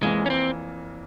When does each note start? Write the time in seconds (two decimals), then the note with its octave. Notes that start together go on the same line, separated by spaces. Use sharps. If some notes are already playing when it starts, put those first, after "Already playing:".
0.02 F1 F2 E3 G#3 A#3
0.26 C#4
0.30 C4